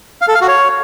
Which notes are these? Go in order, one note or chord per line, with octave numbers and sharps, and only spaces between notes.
F5
A4
F5
F#4
C#5